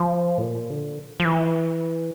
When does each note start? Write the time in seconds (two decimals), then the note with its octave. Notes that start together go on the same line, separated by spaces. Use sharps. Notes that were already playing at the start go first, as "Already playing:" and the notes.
Already playing: F3
0.38 A2
0.43 A#2
0.70 D3
1.20 F3
1.25 E3